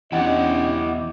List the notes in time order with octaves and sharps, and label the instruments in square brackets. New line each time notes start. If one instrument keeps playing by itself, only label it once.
[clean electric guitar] E2 F#5 [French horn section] C#4 D4 D#5 [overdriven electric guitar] E4 G4